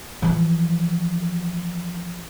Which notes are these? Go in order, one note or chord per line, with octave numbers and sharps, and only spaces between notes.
E3 F3